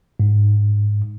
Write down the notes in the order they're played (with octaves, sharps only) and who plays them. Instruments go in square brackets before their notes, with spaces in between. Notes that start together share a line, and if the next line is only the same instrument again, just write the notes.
[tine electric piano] G#2